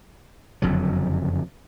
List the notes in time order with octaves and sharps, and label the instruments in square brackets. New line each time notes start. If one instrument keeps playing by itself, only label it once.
[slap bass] F#1 F2 D3 F#3